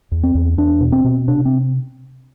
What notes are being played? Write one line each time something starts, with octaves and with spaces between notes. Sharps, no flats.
E2
C4
E2
E2 D4
B2
C4
B2
C3 D4
C4